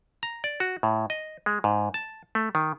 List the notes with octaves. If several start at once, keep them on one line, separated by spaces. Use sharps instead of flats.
A#5
D5
F#4
A2
D#5
G#3
G#2
A5
A3
D#3